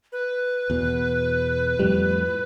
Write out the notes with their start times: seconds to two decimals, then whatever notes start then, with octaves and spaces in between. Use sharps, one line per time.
0.12 B4
0.70 E2 B2
1.79 F2 A2 G3